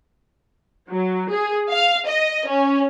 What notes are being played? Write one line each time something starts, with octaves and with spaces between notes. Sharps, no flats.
F#3
G#4
F5
D#5
C#4